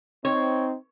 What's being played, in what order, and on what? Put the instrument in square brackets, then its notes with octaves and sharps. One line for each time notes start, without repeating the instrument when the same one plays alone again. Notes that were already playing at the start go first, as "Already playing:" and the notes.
[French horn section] C4 D#4 [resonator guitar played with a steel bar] C#5